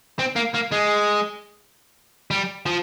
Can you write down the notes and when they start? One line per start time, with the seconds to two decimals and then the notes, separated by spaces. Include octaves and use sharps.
0.19 C4
0.36 A#3
0.54 A#3
0.72 G#3
2.31 G3
2.66 F3